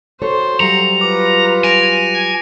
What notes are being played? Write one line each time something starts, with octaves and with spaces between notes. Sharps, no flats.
F#4 A4 C5 C#5
F#3 G3 F5 A#5 C#7
F4 B4 D6
G#5 A#6 D7 F7